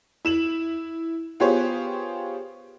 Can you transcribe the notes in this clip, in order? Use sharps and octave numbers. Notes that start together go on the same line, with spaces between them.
E4 E7 F#7
B3 F4 G4 G#4 C5 C#5